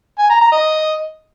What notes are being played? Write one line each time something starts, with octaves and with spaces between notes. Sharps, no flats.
G#5
A#5
A#5
D#5